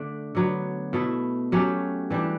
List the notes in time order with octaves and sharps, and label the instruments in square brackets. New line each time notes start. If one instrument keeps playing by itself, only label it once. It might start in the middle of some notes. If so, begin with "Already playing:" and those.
Already playing: [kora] D3 A3 D4
D3 F#3 B3
B2 A3 E4
F#3 A3 C#4 G4
E3 G3 D4